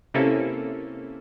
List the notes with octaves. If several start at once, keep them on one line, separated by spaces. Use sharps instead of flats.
C3 A#3 C#4 E4 A4